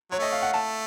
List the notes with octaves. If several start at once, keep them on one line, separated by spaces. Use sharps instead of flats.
F#3 C#5
A3 D#5
F5
F#5
A3 A5